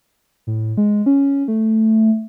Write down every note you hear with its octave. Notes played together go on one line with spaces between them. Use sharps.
A2
G#3
C#4
A3